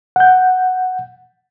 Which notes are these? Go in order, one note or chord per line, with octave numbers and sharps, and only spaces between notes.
F#5 G6